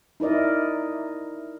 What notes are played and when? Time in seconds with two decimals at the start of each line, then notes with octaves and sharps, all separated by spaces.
0.20 D#4 E4 A#4 D5 D#5